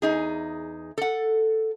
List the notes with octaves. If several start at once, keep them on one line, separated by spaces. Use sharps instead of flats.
E2 D#4 G#4
A4 F#5